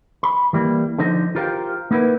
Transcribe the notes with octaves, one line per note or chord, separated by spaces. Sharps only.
B5
E3 G3 A#3
D3 F3 D#4 C5 D#5
F4 G4 A#4 C5 F5 G5
A#3 B3 D#4 E4 A#4 B4